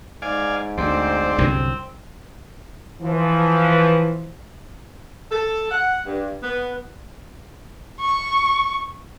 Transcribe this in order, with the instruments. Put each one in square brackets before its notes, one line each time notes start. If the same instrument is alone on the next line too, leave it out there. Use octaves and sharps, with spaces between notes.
[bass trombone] G#2 [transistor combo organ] D5 F5 G#5
[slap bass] D2 [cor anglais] C4 [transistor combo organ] C5 D5
[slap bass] C2 F#2 D3 [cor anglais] C4
[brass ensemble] E3 F3
[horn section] A4
F#5
G2
B3
[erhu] C#6